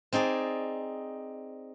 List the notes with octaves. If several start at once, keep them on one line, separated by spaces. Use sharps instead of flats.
C4 D#4 G#4 D5